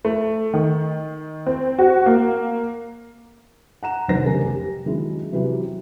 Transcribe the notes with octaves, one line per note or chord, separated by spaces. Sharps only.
A3
D#3
C4
F#4
A#3
F#5 A#5 E7
F#1 C2 D#3 D#4 C5 A#6
F1 D#3 G3 C#4 A#4 G#5
G4
D#3 F#3 G#3 C#4 E4
C3 E3 F#3 G3 E4 G4